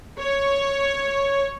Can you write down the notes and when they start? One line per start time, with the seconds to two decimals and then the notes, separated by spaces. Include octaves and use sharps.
0.19 C#5